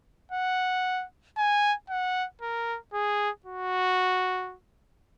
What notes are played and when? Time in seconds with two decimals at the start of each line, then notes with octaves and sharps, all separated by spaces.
0.32 F#5
1.37 G#5
1.89 F#5
2.42 A#4
2.93 G#4
3.46 F#4